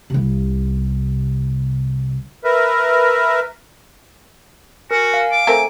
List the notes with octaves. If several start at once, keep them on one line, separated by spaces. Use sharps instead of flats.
C2 C3
A#4 B4 E5
F#4 A#4 G#5
F5
D6
A3 C4 A#4 G#5